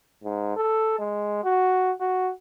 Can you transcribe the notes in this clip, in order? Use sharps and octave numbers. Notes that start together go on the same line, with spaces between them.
G#2
A4
G#3
F#4
F#4